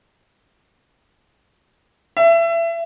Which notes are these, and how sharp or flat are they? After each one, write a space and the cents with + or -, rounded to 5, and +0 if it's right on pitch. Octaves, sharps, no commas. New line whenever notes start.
E5 +25